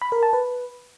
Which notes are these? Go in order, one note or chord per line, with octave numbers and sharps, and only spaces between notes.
B5
A#4
A5
B4